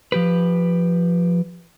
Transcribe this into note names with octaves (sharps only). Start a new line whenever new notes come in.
F3 G4 B4